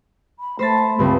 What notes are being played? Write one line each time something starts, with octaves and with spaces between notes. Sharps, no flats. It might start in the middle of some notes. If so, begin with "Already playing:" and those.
B5
A3 C5 B5 A6
C#2 G2 C4